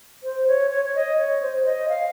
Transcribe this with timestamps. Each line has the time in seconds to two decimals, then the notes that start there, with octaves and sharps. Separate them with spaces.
0.23 C5
0.48 C#5
0.71 C#5
0.85 C#5
0.95 D#5
1.18 C#5
1.42 C5
1.65 D#5
1.89 F5